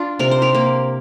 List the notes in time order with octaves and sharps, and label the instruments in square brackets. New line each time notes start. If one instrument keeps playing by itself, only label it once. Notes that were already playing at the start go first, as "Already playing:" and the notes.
Already playing: [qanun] D4 F4
C3 A#4
C5
G4 A#4
A#3